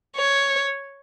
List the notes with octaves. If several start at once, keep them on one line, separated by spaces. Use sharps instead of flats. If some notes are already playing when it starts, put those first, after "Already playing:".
C#5